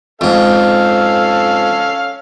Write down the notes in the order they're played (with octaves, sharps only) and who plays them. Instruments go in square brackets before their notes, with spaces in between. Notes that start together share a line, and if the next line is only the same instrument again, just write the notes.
[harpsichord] F2 G#2 [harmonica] C#4 A4 F5